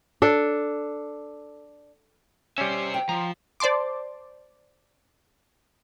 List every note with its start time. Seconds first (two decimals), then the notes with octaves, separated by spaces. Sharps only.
0.22 D4 A4
2.58 G3 C#4 C5 E5
2.94 G5
3.09 F3 A#5
3.60 C5 D5 A5 C6 D6